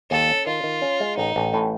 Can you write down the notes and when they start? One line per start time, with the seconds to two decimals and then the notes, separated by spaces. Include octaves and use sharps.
0.11 D#2 A4
0.28 C#4
0.47 D#3 F4
0.64 D#3
0.82 C#4
1.00 G#3
1.17 A1 D#4
1.36 A1
1.54 A2